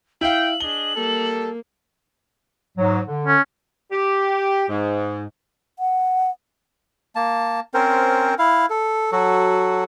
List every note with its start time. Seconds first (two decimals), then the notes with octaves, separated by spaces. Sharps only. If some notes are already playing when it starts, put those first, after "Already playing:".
0.21 E4 F5 G5 F#7
0.60 D4 G#4 D#5 G7
0.95 G3 A#3 A4
2.78 G#2 F#3
3.06 D3
3.27 C#4
3.92 G4
4.69 G#2
5.79 F#5
7.16 A#3 A5
7.74 C4 C#4 A#4 C5
8.39 E4 F5
8.70 A4
9.12 F#3 F#4 A4